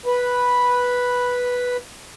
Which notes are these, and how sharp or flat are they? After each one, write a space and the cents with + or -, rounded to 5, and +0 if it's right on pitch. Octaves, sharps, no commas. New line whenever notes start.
B4 -5